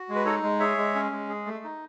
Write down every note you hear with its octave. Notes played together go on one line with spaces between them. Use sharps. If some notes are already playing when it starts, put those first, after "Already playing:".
Already playing: F#4
G#3
B4
D#4 A4 C#5
G#3
G#4 C#5 E5
G#3
C#4
G#3
G#4
A3
D#4